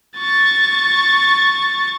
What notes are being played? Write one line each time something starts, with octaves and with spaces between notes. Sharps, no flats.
C#6 A6